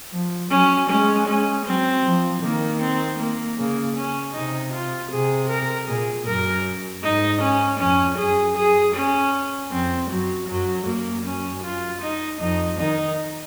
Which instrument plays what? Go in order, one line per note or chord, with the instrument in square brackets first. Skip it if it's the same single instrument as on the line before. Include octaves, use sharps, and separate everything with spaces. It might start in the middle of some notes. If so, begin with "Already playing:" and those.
[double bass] F3
[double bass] F#3 [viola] C#4
[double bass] G#3 [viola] C#4
[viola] C#4
[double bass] F#3 [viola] C4
[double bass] F3
[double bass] D#3 [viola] A#3
[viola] C4
A#3
[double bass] C#3 [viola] A#3
[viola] C#4
[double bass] C3 [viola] D#4
[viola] F4
[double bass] C3 [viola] G#4
[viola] A#4
[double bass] A#2 [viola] G#4
[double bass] F#2 [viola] A#4
[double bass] G#2 [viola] D#4
[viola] C#4
[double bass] F2 [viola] C#4
[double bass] F#2 [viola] G#4
[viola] G#4
C#4
[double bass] F2 [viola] C4
[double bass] F#2 [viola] F#3
[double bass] F#2 [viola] F#3
[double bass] F#2 [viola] A#3
[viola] C#4
F4
D#4
[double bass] F2 [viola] D#4
[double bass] D#3 [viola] D#4